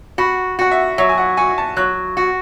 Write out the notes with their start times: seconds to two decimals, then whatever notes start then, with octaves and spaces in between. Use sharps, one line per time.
0.18 F#4 B5
0.59 F#4 F#5
0.71 E5
0.98 F#3 E5
1.09 G#5
1.18 F#5
1.37 F#4 G#5
1.58 A5
1.76 F#3 F#6
2.17 F#4